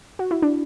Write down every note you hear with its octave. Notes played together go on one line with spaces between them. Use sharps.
F#4
E4
D4